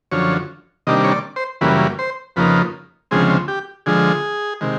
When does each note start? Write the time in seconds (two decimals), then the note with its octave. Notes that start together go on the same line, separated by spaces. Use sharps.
0.11 F#2 D3 F3 C#5
0.87 C3 D#3 G3 A#3 D4 D#5
1.04 C#5
1.12 D5
1.36 C5
1.61 F#2 C#3 E3 G3 A#3 B4
1.99 C5
2.36 F2 C#3 F3 A#3 D#4 B4
3.11 D2 C#3 F3 G#3 C4 G#4
3.48 G4
3.86 D3 F3 G#3 G#4
4.61 C3 D#3 G#3